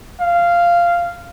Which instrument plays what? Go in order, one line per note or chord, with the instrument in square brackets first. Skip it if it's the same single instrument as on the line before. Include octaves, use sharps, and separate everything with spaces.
[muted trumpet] F5